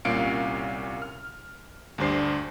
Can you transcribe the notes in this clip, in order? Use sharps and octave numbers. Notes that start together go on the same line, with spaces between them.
C2 A#2 C#4 F5 C#7 D7
F6
D2 G2 D4 C5 C7